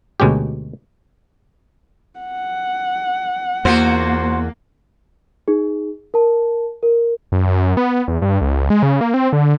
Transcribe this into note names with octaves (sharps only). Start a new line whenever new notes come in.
D2 B2 G#3 C#4 G4
F#5
E2 A#3 F4 F#4 C5
D#4 G#4
A#4 A5
A#4
F#2
F#2
B3
E2
G2
C#2
G#3
C#3
A#3
C4
D3